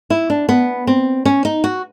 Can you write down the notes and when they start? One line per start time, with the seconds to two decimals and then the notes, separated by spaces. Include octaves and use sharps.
0.10 E4
0.30 D4
0.49 B3
0.87 C4
1.25 C#4
1.45 D#4
1.64 F#4